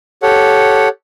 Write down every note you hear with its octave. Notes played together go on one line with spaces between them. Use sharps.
G4 A4 C#5 F#5